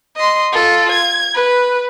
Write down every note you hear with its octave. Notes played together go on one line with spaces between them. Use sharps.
D#5 C6
F4 A4
G#6
B4